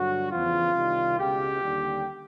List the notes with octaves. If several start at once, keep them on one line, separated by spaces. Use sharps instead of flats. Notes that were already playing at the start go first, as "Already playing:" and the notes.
Already playing: G2 D3 F#3 F#4
E2 C#3 F3 F4
C2 C3 D#3 G3
C#2 B2 G#3 G4
D#2 D3 G3